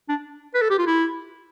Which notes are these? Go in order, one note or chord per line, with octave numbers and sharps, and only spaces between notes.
D4
B4
A4
G4
F4
E4